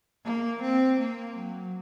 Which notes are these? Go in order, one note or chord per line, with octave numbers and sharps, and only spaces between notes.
A#3
C4
A#3
F#3